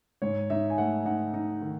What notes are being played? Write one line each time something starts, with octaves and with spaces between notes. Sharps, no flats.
G#2 C#5
D#4 E5
G#5
A3 F#5
D#4 F#5
D#4
D#3